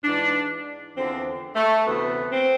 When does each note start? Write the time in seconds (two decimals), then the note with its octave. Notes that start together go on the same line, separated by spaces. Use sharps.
0.04 G#2 E3 D4
0.96 E2 D3 F3 C4
1.56 A3
1.86 D2 C3 E3 B3
2.32 C4